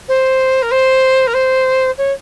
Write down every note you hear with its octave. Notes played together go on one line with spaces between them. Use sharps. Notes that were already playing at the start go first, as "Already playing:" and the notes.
C5
A#4
C5
A#4
C5
C#5